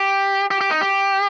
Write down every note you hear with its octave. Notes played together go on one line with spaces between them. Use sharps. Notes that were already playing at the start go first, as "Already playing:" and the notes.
Already playing: G4
G4
G4
D#4
G4